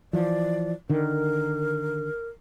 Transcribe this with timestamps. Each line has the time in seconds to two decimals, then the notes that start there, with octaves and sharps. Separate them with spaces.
0.13 E3 F3 D5
0.89 D3 D#3 A#4